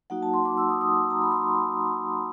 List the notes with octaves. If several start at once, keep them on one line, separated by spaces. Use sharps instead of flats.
F#3 A#3 D#4 F#4 F#5
A5
C6
D6
E6
D#6
D#6
A#5
B5
C6